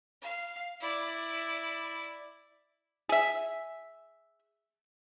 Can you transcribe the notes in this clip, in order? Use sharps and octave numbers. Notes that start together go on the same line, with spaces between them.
F5
E4 D5
G#4 E5